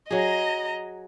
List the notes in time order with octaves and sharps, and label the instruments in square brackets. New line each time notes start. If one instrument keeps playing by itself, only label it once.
[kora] F#3 G#4 [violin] D#5 A#5